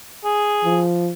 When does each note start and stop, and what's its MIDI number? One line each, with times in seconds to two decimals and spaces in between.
0.25 0.82 68
0.65 1.11 53